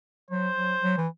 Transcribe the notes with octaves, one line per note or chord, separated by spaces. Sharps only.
F#3 C5
F#3
F#3
E3